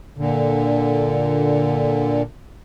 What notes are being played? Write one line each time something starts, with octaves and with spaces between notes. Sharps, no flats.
A#2 D3